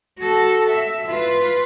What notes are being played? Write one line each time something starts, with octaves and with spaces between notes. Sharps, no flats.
F#4 A4
E5
F4 B4